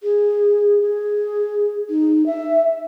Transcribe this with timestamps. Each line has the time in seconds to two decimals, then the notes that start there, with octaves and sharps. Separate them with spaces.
0.03 G#4
0.82 G#4
1.90 D#4
2.26 E5